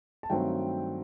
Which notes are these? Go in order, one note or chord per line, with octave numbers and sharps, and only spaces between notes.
A5
G2 D#3 F#3 A3 C4 G5